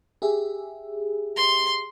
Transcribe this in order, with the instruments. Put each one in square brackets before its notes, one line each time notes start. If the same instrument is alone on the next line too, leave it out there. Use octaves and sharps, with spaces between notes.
[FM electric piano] G4 G#4 E5
[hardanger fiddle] C6